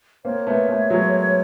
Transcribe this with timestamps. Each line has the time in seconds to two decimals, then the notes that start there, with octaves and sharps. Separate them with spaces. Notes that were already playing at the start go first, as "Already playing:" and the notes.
0.25 A#3 C4 C#5
0.47 A3 B3
0.68 A3 B3
0.90 F#3 G#3